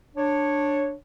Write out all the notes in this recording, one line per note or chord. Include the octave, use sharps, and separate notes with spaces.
D4 C#5